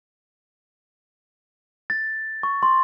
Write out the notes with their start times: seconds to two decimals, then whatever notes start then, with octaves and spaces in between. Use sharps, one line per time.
1.90 A6
2.43 C#6
2.63 C6